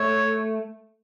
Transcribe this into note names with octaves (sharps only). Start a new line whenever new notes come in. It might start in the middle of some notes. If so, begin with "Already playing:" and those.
Already playing: A3 C#5